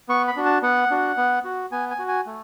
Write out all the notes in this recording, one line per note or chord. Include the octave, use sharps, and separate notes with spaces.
B3 C#6
B5
D4 F#4
A5
B3 F#5
D4 F#4
B3
F#4
B3 G#5
G#5
F#4
G#5
A3